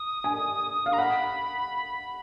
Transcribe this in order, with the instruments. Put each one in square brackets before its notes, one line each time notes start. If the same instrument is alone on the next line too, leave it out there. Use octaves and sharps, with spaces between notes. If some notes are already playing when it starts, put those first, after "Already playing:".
Already playing: [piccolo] D#6
[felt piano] G#5
F5
[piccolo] A#5
[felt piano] F#5 [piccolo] B5